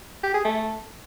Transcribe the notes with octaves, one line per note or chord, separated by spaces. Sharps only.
G4
G#4
A3